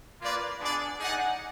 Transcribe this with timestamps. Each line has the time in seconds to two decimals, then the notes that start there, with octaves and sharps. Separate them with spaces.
0.21 A#3 F4 B4 D5
0.60 B3 D4 G#4 D5
1.00 D#4 G#4 D5 F#5